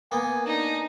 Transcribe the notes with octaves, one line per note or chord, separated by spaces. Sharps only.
A#3 B3 G#5
D4 D#4